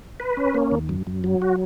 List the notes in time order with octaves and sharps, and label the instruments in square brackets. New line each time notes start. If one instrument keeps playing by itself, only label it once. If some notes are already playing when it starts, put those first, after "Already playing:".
[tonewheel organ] B4
C#4
A#3
D#2
F#2
F#2
F#3
F#4